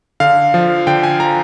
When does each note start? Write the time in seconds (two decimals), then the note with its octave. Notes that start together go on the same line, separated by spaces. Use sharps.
0.20 D3 F5
0.54 F3
0.87 D3 G5
1.03 G#5
1.20 F3 A#5